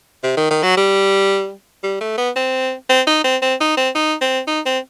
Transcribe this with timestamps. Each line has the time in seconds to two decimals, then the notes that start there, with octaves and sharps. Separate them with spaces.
0.24 C3
0.37 D#3
0.51 D#3
0.63 F#3
0.77 G3
1.83 G3
2.01 A3
2.18 B3
2.36 C4
2.89 C4
3.07 D#4
3.24 C4
3.42 C4
3.60 D#4
3.77 C4
3.95 D#4
4.21 C4
4.48 D#4
4.66 C4